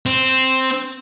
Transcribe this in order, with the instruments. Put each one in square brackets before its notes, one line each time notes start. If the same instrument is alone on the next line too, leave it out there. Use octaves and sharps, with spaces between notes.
[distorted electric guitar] C4